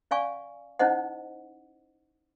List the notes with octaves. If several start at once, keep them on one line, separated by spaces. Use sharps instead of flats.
C#4 D5 F5 G#5 C#6
C#4 D#4 E4 C5 D#5 F#5